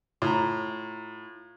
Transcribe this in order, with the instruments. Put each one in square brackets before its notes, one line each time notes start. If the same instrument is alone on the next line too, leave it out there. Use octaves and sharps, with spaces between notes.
[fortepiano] A2 [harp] F4 A#5